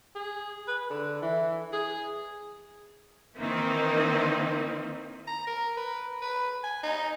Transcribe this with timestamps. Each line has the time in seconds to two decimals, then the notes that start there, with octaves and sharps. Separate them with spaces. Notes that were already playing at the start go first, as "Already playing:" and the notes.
0.15 G#4
0.68 B4
0.90 D3
1.22 E3
1.72 G#4
3.38 D#3 E3 A#3 C4 D#4
5.27 A#5
5.47 A#4
5.77 B4
6.22 B4
6.63 G#5
6.83 D#4